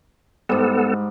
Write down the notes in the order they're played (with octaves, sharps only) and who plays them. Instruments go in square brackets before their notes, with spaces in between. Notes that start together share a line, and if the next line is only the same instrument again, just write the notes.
[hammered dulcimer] G#2 G3 [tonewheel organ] B3 A4